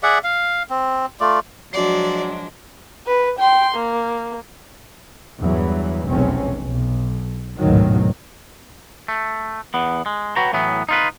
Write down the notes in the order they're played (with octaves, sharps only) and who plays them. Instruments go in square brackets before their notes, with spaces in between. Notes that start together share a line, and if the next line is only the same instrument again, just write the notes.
[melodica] G#4 D5 E5 F#5
F5
C4
A3 F4 D5
[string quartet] F3 G#3 D4 [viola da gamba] F#3 [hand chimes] F#4 C7 [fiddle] D5
[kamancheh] B4
G5 C6
A#3
[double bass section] E2 G2 E3 F#3
F1 B1 E2 C4 C#4
B1
A1 D2 G#2 B2 D#3 F#3
[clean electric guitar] A3
E2 B3
G#3
F#4 B4 C#5 G5 A#5
A2 E3 F#3 B3
D#4 F4 B4